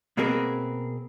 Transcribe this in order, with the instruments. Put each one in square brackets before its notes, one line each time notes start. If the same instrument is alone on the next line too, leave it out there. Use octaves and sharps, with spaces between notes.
[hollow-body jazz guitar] B2 A#3 C4 G#4 A#4 B4